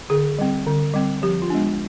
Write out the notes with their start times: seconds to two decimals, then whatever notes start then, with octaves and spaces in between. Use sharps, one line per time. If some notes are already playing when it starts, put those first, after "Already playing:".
0.10 D3 G#4
0.39 G3 C4
0.67 D3
0.94 G3 C4
1.22 F3 G4
1.42 F4
1.50 G#3 B3 D4